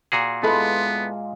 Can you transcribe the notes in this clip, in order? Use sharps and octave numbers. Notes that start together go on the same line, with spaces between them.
A#2 F#4 G#4
G#3 B3 E4 F4 A4 B4